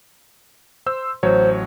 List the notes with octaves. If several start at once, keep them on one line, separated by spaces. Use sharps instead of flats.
C5 C6 E6
A1 F#3 C5 C#5